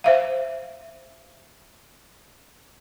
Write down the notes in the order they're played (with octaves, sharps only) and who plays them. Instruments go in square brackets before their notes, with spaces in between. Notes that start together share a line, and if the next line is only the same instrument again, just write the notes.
[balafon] C5 E5 F5